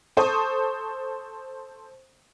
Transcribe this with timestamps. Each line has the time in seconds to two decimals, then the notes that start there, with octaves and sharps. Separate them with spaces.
0.17 A4 C5 C#6 D#6